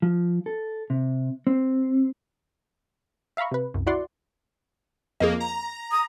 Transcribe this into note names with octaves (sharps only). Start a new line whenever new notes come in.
F3
A4
C3
C4
E5 F5 A#5 B5 C#6
C3 B4
C2 F#2
E4 F#4 D5 F#5 C6
F2 A#3 G#4 D#5
A#5
D#6